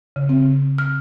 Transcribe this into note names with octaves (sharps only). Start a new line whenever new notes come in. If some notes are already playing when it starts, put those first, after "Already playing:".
C#3
C4
F6